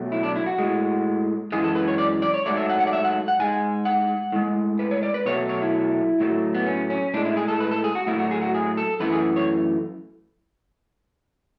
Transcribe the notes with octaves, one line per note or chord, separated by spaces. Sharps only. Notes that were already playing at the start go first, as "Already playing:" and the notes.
Already playing: B2 F#3 A3
E4
D4
E4
F#4
A2 G#3
F#2 E3 G#3 G#4
A4
B4
C#5
D5
D5
C#5
G#2 F#3 A3 D5
E5
F#5
F#5
D5
E5
F#5
F#5
G#2 G#3 G#5
F#5
A2 G#3
B4
C#5
D5
B4
B2 F#3 A3 C#5
C#5
E4
A2 F#3 A3
B3
C#4
C#4
A2 G#3 D4
E4
G#4
A4
B4
A4
G#4
F#4
A2 F#3 A3 E4
F#4
G#4
F#4
G#4
A4
F#2 E3 A3 B4
G#4
C#5